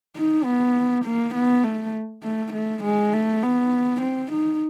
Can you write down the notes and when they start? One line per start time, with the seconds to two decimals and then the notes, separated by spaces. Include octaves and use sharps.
0.16 D#4
0.45 B3
1.04 A#3
1.35 B3
1.64 A3
2.23 A3
2.53 A3
2.84 G#3
3.13 A3
3.43 B3
4.01 C4
4.32 D#4